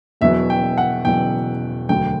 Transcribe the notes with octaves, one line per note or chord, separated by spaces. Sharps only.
E1 E2 B2 F#3 E5
G5
F#5
E1 E2 B2 F#3 G5
E1 D2 D3 F#3 G5